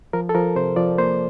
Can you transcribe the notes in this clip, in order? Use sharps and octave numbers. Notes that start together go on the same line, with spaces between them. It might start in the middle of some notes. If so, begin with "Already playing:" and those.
F3 A#4
A4
F3 A#4
C3 C5
F3 D5
A#3 C5